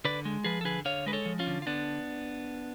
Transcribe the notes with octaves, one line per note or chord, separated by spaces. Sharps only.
D3 B4 D5
G#3
F3 G#4 B4
A4
D3 G#4 B4
D3 C#5 F5
G#3 B4
A4 C#5
F3
C#4 F4
D3
F4
D3 B3 D4